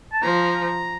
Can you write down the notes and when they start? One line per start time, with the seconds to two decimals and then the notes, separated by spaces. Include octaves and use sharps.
0.13 A5
0.22 F3 A#5